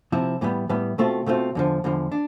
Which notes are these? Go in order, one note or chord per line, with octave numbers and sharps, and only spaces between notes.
C3 F3 C4 E4
A2 E3 G3 B3
A2 E3 G3 B3
B2 A3 C4 F4
B2 A3 C4 F4
E2 D3 F3
E2 D3 F3
D4